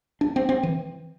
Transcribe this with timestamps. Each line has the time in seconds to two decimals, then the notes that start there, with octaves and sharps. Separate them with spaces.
0.21 D4
0.36 C4
0.49 C4
0.63 E3